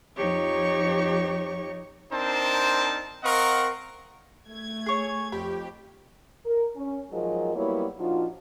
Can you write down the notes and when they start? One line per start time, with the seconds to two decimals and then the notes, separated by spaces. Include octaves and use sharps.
0.16 F2 F3 D#4 G4 C#5 C#6
2.11 C4 D4 D#4 A#4 C5 A5
3.23 C4 A#4 D#5 F5 F#5 C#6
4.49 A3 G#6
4.86 G#4 C#5
5.32 F2 G4 B5
6.45 A#4
6.76 C#4
7.11 G#2 F3 F#3 G#4 A#4 D#5
7.55 F#3 G3 A#3 B3 E4 C#5
7.99 A#2 F3 D4 D#4 F4 F#4